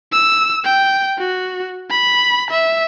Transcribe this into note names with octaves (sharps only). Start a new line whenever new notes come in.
E6
G5
F#4
B5
E5